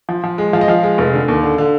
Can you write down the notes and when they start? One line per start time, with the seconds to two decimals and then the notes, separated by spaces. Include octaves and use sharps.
0.09 F3
0.24 F3
0.38 G#3
0.53 F3 F5
0.61 D#5
0.68 F3 F5
0.83 G#3
0.98 F1
1.13 D3
1.28 D#2
1.43 D3
1.58 D3